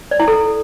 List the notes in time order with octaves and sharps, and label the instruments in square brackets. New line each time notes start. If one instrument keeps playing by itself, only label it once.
[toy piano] D5
E4
A4